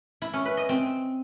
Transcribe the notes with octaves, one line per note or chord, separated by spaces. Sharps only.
E4
C#4
B4
D#5
C4